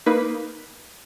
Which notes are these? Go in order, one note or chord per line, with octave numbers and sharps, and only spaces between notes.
A#3 D#4 B4